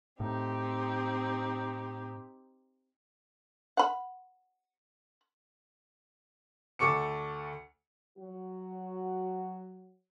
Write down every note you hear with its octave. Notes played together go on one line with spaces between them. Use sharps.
A2 C4 D#4 G4
F#5 B5
D2 A4 C#6 D6 C#7
F#3 F#4